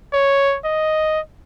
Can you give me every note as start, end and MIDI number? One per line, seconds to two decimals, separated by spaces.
0.13 0.57 73
0.65 1.20 75